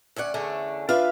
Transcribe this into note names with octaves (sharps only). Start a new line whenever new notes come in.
D2 C#4 D5 F#5
E2 D3 A3 C#4 D4
F3 D4 F4 B4 E5 F5